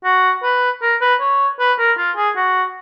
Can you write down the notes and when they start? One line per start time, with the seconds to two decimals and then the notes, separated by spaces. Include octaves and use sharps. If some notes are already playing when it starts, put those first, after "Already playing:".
0.04 F#4
0.43 B4
0.82 A#4
1.01 B4
1.20 C#5
1.60 B4
1.79 A#4
1.98 F4
2.16 G#4
2.36 F#4